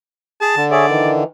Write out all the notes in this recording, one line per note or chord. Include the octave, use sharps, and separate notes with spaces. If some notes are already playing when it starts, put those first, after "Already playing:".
G#4 A5
D3
G#4 C#5 D5 E5
D#3 E3